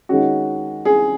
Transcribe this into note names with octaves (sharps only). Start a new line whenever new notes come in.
D#3 G#3 C#4 F#4
G#4